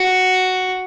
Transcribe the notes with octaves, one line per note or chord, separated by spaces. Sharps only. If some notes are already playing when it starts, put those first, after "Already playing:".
Already playing: F#4